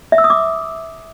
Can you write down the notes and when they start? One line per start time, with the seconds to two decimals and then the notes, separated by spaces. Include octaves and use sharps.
0.12 E5
0.18 E6
0.24 D#6
0.30 D6